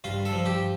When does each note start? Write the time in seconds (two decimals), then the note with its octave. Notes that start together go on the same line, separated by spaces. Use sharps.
0.04 G2 F4
0.25 A4
0.32 F3
0.46 G4